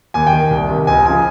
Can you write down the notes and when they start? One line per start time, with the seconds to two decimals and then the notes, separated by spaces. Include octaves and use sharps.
0.14 D#2 G#5
0.27 G5
0.33 D#3
0.51 C2
0.69 C3 D#3
0.87 C#2 G#5
1.06 C#3 F3 G#5